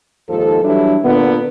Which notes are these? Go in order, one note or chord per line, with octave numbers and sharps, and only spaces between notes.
D#2 G#2 F3 A4
E3 F#3 G3 D4 E4
A#2 D3 B3